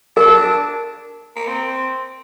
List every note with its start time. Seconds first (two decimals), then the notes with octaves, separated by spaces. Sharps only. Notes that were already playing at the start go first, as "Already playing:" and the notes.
0.16 D4 A#4
1.36 A#3
1.48 C4